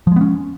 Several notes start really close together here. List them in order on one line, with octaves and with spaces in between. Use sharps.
F3 G#3 B3 C#4